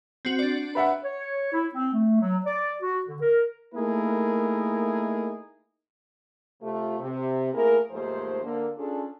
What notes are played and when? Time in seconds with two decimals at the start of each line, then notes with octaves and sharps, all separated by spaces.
0.25 C4 F#4
0.39 D4 D5
0.75 B4 E5 F#5
1.04 C#5
1.53 E4
1.75 C4
1.93 A3
2.21 F#3
2.46 D5
2.82 F#4
3.06 D3
3.21 A#4
3.75 A3 A#3 D#4 E4 G#4 A#4
6.62 C3 A3 F4
6.98 C3
7.52 A3 A#3 E4 G#4 A#4
7.91 D#2 G#2 F3 A3 C5
8.43 D3 A#3
8.76 C#4 D4 F4 G#4 A4